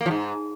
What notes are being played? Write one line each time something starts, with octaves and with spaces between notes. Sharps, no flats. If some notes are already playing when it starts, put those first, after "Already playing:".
A#3
F3
G#2